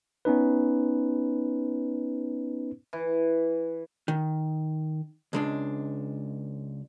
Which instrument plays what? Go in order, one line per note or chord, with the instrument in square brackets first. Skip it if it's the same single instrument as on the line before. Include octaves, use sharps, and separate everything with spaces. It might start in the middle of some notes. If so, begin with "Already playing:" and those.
[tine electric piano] B3 C#4 D#4 B4
[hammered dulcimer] E3
[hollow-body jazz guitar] D#3
C#2 G#3 D4